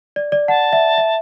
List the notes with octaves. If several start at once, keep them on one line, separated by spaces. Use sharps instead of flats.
D5
D5
F#5 A5
E5
E5